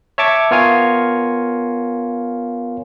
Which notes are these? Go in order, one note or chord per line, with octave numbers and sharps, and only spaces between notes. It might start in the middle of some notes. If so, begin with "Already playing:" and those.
C#5 E5 A5 C#6 D6
B3 F4 A#4 C#5 F5 G#5